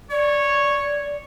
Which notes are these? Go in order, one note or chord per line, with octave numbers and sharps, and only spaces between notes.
C#5 D5